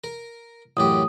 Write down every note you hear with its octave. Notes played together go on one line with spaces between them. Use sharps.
A#4
A1 F#2 G4 D#6